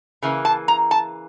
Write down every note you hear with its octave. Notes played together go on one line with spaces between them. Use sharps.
C#3 E3 A#3
A5
A#5
A5